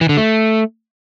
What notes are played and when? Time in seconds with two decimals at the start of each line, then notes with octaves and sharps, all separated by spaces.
0.01 E3
0.09 D3
0.17 A3